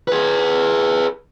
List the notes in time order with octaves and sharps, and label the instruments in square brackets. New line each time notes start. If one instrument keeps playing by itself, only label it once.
[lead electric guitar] G#4 B4